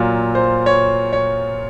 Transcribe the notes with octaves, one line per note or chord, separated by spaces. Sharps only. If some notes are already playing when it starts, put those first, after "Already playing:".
Already playing: A#2 F#3 F4
C5
C#5
C#5